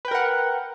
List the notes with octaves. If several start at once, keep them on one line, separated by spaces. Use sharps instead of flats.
A#4 B4 F#5 G5